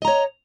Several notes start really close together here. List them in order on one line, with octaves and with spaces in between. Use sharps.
D#5 A#5 C#5